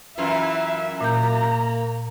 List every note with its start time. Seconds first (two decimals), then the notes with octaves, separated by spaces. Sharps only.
0.18 F#2 E3 E4 F4 E5 F5
1.01 A#2 A#3 A#5 G6